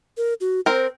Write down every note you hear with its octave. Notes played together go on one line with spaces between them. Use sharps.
A#4
F#4
C4 A#4 C5